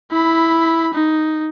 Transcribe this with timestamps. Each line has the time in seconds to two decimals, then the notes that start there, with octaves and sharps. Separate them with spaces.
0.11 E4 B5
0.94 D#4